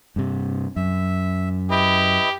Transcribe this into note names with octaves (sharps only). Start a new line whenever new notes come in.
G2 C3
F#2 E5
E4 G4 B4 D#5